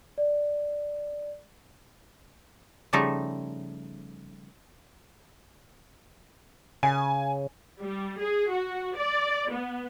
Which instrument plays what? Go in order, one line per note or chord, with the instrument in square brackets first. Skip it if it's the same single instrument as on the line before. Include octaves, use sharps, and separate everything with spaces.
[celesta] D5
[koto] C#3 F3 G3 A3 D#4 A4
[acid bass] C#3 [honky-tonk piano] G#5
[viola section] G3
G#4
F#4
D5
B3